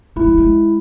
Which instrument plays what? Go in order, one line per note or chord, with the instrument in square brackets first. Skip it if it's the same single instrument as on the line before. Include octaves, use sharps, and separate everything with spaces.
[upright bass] G#3 [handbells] E4
[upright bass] F#3
G#3